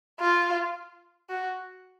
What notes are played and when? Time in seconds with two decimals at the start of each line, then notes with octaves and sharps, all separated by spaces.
0.20 F4
1.30 F#4